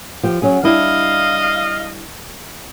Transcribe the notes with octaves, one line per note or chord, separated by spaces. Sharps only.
F3 G4
F#3 C#4 G#4
G3 D4 E4 D#5 F5